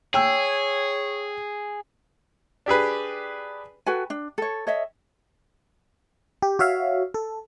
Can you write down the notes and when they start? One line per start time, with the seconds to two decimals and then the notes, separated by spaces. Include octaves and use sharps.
0.14 G#4 C#5 G5 E6
2.66 D4 G4 G#4 B4
3.86 F#4 A4 B4 G#5
4.10 D4
4.38 A4 C#5
4.67 C#5 D#5 E5
6.42 G4
6.59 F#4 C#5 E5 F5
7.14 A4